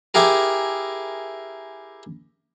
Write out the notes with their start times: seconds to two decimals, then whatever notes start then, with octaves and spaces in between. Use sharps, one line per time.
0.14 E4 G4 G#4 A#4